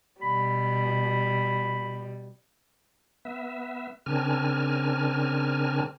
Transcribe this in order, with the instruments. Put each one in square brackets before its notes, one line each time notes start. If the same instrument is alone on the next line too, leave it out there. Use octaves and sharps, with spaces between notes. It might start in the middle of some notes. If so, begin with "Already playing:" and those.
[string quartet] B2 G3 [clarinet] B5
[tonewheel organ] B3 E5
C#3 C4 D4 A#4 G#5 F6